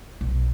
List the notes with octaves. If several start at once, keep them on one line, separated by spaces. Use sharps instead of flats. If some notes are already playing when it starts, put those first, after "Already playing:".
B1